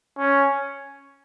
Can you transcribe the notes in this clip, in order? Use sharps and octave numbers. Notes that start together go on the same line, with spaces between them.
C#4